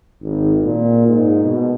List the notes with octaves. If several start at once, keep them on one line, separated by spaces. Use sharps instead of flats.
G#1
A#2
G#2
B2